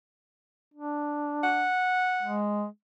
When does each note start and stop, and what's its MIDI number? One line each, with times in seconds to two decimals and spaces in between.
0.74 1.69 62
1.44 2.39 78
2.22 2.65 56